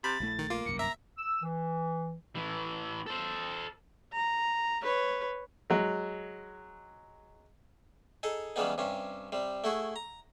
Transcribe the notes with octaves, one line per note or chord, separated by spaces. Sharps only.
C3 B5 A6
A#1 A2 E3 A3
D#3
A#3 F4
G1 C2 F#2 C#7
E5 A#5
E6
E3
A2 E3
A4 C5
A#5
B4 C#5
F#3 G#3
D#4 G#4 A4
C#3 E3 G3 G#3 B3 D#4
G2 C3 C#4
C3 G3
A3 E4 F#4 G#4
A#5